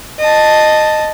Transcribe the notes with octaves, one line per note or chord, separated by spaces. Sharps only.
D#5 A5